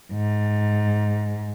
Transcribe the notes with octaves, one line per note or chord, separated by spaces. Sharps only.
G#2